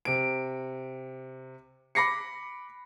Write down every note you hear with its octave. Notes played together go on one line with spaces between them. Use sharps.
C3 D7
B5 D6 A#6 C7 C#7